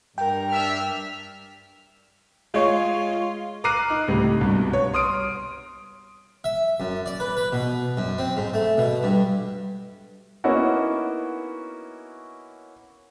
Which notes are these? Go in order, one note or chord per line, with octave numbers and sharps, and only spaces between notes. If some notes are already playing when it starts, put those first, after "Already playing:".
G2 A#4 G5
D4 E5 F6
G#3 F4 C#5
A#5 D6 F6 F#6 C7 D#7
D#4
C#2 A2 C3 G3
C2 G2 B2
C#5
C6 D#6 F6 D7
E5
F#2
D5
B4
B4
B2
F#2
C4
G#2
A3
B2
G2
A#3 B3 C#4 D#4 E4 F#4